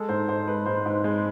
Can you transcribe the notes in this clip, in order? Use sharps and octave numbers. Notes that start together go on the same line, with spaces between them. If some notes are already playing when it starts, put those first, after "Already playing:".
Already playing: G#3 A4
G#2 C5
G#2 C5
G#3 B4
G#2 C5
G#2
G#3